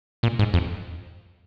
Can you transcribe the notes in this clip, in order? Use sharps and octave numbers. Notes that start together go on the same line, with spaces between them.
A#2
G#2
F2